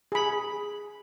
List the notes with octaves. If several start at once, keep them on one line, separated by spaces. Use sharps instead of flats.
G#4 B5